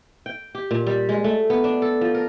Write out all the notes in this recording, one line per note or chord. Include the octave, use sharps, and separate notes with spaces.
G5
G4
A#2
G3
G#3
A3
B3
D4
A4
F3
A#4